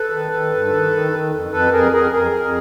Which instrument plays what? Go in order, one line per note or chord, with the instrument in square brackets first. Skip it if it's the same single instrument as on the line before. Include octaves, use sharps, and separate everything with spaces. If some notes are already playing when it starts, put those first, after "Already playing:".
Already playing: [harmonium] A4 B4
D#3
D#3
G2
D#3
D#3
D#3
F2
F2 A4 B4
F2 G#4 A#4
F2 G#4 A#4
F2 G#4 A#4
F2